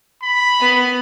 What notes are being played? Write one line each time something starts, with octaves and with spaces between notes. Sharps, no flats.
B5
B3